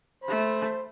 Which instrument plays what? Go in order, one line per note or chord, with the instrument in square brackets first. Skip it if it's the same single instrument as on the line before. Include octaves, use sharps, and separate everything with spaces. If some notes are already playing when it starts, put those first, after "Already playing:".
[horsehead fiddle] A3 B5 [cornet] C5